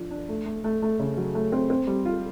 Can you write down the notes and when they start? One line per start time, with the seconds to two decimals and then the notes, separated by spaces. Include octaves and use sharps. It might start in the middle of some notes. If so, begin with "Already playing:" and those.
Already playing: F3 D4
0.11 D4
0.29 A3
0.46 A3
0.64 A3
0.82 A3
1.00 C#3
1.17 F#3
1.35 A3
1.52 C4
1.70 C4
1.87 G3
2.05 F4